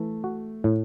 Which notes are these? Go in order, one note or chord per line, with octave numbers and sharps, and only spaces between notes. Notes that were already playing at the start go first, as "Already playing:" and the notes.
Already playing: E3 A3
F#4
A2